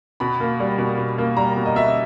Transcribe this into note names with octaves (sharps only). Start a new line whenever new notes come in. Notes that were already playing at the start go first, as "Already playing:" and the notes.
B2 B5
A#3
G3
B2
B2
A#3
G3 A#5
B2
D#5
B2 E5